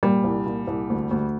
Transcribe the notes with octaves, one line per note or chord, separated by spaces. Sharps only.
A#2 G3
C2
A#2
C2
D2
D2